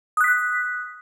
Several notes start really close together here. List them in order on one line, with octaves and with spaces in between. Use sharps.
D#6 F#6 B6